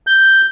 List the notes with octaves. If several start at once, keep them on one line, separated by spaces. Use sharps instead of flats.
G6